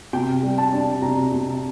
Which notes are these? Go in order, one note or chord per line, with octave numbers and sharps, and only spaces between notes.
C3 G5
G3
A5
D4
C3 A#5
C3